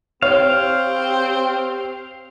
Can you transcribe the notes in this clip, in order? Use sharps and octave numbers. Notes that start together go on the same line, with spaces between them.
C4 G4 C#5 F5